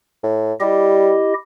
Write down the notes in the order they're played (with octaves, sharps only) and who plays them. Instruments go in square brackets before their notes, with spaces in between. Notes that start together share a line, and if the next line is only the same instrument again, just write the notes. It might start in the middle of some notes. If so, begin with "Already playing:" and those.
[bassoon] A2
[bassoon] G3 [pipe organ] E4 G4 D#5